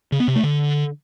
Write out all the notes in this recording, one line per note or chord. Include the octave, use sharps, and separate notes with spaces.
C#3
B3
C3
A3
D3